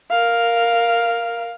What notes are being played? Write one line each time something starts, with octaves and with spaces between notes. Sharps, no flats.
A#4 F5